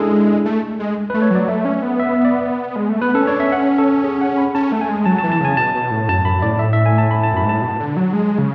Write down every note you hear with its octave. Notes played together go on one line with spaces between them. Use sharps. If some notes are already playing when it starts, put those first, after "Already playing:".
Already playing: G#3 D4 E4 G#4 A4
A3
G#3
B4
A3
C#5
F#3 D5
A3 E5
C#4
B3
E5
D5
G#3
A3
B3 B4
C#4 A4
D4 C#5
C#4 E5
F#5
A4
G#4
F#5
B5
C#4 A5
A3
G#5
G#3
F#3 A5
A5
E3
A5
C#3 G#5
B2 A5
B2
A2
F#2 A5
F#2 B5
A2 D5
E5
E5
G#5
A5
B5
A5
F#2 B5
G#2
A2 A5
B2
D3
F#3
G#3
C#3